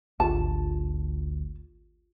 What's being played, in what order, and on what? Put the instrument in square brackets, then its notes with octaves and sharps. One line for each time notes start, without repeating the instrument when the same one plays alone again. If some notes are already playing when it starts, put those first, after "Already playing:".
[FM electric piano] G#1 [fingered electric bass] D2 [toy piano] F4 G4 G#4 [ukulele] A5